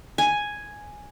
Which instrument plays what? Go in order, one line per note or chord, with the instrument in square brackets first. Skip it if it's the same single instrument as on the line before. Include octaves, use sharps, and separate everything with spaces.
[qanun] G#5